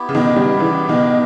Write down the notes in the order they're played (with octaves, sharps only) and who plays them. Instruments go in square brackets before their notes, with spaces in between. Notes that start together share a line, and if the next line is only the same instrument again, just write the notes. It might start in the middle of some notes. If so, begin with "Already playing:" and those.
Already playing: [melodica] B3 E4 G4
[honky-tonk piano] C#3
B2 D#3
D#3 G3
C#3 E3
B2 D#3